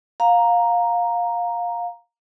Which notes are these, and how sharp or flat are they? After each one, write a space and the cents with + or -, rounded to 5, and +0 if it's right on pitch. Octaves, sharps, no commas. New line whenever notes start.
F5 +15 A#5 +0